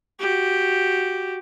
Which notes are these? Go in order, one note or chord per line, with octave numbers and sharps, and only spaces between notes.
F#4 G4